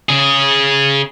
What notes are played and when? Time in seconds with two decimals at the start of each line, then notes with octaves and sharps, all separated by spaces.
0.09 C#3 G#4